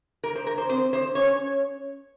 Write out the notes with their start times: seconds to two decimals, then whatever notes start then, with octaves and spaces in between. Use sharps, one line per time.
0.24 A#4
0.35 C5
0.47 A#4
0.58 C5
0.69 C4 C5
0.93 C5
1.15 C#4 C#5